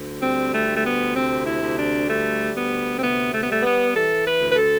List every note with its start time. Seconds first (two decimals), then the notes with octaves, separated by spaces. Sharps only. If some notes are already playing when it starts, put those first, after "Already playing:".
Already playing: D2
0.20 G3 C4
0.52 A3
0.67 D2
0.75 A3
0.82 B3
1.13 C3 C4
1.45 E4
1.60 D2
1.76 D4
2.07 G3 A3
2.53 D2 B3
2.96 C4
3.00 C3 B3
3.32 A3
3.41 B3
3.47 G3 A3
3.63 B3
3.94 E3 A4
4.24 B4
4.40 D2
4.52 B4
4.56 A4